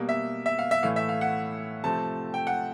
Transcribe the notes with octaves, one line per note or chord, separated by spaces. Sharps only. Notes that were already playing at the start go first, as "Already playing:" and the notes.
Already playing: B2 G3 A#3
E5
E5
F5
E5
A2 E3 A3 F5
E5
F5
F#5
C3 F3 A3 C4 A5
G5
F#5